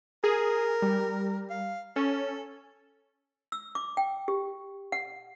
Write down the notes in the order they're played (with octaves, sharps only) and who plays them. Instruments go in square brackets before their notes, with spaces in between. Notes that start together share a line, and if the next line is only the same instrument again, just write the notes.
[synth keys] G#4 [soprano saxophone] A#4
[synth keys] G3
[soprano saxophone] F5
[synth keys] C#4 [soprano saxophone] A4
[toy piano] E6
D6
G5
G4
F#5